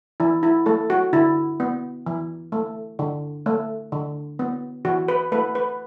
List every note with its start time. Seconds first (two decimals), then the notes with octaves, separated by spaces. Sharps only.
0.20 E3 E4
0.43 E4
0.66 A3 A4
0.90 F#4
1.13 D3 E4
1.60 B3
2.06 E3
2.52 A3
2.99 D3
3.46 A3
3.92 D3
4.39 B3
4.85 E3 F#4
5.08 B4
5.32 A3 B4
5.55 B4